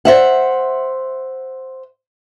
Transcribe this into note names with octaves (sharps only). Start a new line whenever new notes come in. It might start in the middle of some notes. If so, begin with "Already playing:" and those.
C5 E5 F#5